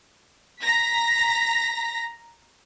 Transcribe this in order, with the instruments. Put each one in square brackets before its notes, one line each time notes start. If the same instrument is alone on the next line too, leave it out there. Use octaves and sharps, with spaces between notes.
[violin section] A#5 A#6 B6